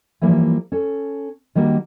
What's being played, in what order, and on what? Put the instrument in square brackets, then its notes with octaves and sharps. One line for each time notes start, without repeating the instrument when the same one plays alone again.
[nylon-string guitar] E3 F3 G3 A#3 E4
C#4 A4
D#3 G3 A#3 D4 F#4